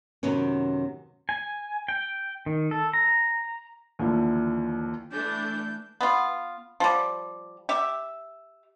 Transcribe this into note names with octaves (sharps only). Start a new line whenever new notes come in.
F#2 C3 D#3 B3 C#4
G#5
G5
D#3
A4
A#5
D#2 D3 E3 F3
E3 A3 D4 G6
B3 F4
F3 G3
G4 E5